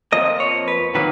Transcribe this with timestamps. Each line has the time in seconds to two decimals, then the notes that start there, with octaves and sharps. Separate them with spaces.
0.12 F2 F3 A#3 D#5
0.40 C#5
0.68 B4
0.95 D#3 F#3 A#3 B4